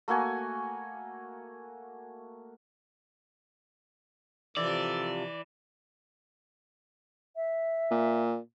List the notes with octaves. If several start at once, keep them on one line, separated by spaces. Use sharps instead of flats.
A3 A#3 F#4 G#5
C3 E3 F3 A4 D5
E5
A#2